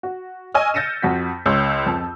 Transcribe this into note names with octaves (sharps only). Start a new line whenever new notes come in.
F#4
D#5 G#5 C#6 E6 F6
G6 A6 A#6 C#7 D#7 E7
F2 F#4 B6
C#2 C#5 C6 E6 G6
F2 A5